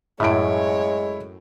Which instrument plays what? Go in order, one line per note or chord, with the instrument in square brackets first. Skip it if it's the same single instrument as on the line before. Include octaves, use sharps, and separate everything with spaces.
[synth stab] F#2 A2 [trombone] G#3 [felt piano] E4 D7 [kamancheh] C#5